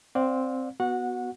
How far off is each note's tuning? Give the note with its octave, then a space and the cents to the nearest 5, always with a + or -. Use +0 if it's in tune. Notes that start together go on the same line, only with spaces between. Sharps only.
C4 +0 D5 +0 F5 +40
B3 +0 F#4 +0 F#5 -20